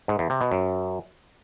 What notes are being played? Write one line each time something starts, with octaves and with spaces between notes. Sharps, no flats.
G#2
E2
C3
B2
F#2